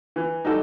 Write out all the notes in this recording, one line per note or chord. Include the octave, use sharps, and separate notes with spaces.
E3
G3 D#4 F#4 A4